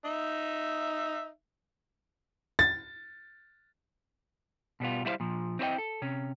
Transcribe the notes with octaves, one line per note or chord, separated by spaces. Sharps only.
D#4 E5
A6
B2 G3 B3 F4
G3 E4 F#4 B4 C5 F5
A#2 F3
C4 E4 A4 C#5 D#5 G5
A4
C3 C#4